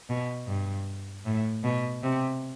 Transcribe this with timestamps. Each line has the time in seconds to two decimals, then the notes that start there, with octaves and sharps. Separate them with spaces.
0.09 B2
0.48 G2
1.26 A2
1.64 B2
2.03 C3